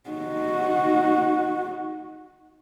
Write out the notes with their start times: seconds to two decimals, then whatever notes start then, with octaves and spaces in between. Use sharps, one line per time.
0.10 D#4 F#4